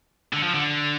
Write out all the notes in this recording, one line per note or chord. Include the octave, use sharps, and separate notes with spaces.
D3
F3
D3